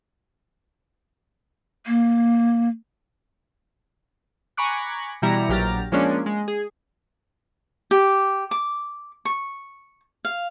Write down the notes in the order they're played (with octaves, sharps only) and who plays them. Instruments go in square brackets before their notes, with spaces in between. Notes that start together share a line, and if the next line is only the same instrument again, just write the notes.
[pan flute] A#3
[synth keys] G#5 A#5 B5 C#6 D6 F#6
B2 E3 G3 E4 A#5 C#7
A#1 F#3 G4 A#5 F6 A6
F3 G#3 A#3 C#4 D4
G#3
G#4
[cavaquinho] G4
D6
C#6
F5